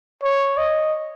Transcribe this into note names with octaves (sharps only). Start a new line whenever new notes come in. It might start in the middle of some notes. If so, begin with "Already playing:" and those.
C#5
D#5